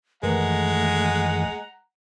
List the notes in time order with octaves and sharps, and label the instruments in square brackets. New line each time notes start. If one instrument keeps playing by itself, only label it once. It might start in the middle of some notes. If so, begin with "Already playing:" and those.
[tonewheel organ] F#2 D#3 E3 [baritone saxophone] G#3 [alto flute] A3 [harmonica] F#5 A#5